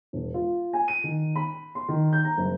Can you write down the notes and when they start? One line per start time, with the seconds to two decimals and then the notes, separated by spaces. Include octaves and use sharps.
0.13 E1
0.34 F4
0.73 G#5
0.88 D#7
1.04 D#3
1.36 B5
1.75 C6
1.88 D#3
2.13 G6
2.25 A#5
2.37 F#1